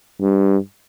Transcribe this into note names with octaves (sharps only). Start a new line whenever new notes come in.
G2